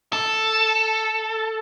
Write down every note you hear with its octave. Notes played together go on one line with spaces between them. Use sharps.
A4